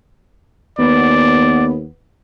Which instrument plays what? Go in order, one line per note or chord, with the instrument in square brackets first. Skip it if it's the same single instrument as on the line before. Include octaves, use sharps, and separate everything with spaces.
[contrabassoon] D#2 [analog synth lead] B3 [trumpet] D5